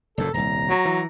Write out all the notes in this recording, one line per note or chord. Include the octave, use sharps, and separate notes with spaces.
F#1 F#2 A#2 A4
D#1 C2 A#5
F#3
E3